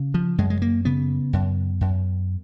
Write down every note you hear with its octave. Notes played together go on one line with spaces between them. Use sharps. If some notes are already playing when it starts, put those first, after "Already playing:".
Already playing: C#3
F3
F#2 G#3
G#3
A#3
C#3 B3
F#2
F#2